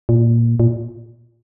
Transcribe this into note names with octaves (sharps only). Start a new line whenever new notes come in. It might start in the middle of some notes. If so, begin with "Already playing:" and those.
A#2
A#2